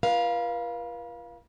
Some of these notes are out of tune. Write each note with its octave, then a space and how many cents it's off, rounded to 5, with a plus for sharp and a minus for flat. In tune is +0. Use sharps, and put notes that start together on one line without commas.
F4 -40 B4 -40 F5 +0